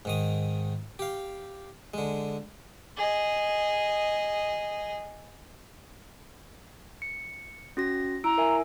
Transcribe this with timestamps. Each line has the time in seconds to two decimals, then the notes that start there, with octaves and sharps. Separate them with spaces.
0.05 G#2 D#3 D#6
0.99 G4 F5
1.94 D3 G#3
2.97 G#4 D#5
7.02 C#7
7.77 C#4 F#4 A#6
8.24 E4 A#5 E6 D7
8.38 A#4 E5 G#5